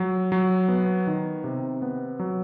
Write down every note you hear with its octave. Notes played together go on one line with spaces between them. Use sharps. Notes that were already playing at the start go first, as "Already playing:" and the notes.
Already playing: F#3
F#3
B3
D#3
C3
B3
F#3